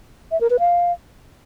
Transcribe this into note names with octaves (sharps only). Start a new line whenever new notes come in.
E5
A#4
B4
F5